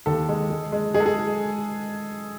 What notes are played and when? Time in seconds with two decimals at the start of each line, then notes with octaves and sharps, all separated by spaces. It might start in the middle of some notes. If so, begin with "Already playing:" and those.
0.06 D#2 A4
0.29 G#3
0.50 G#3
0.72 G#3
0.94 G#3 G#4
1.00 A4
1.06 G#4